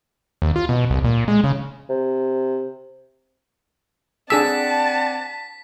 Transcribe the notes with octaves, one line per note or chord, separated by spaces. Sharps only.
D#2
F4
B2
C2
A#2
G#3
C#3
C3
C4 D4 G#4 D5 F#5 A5 E6 B6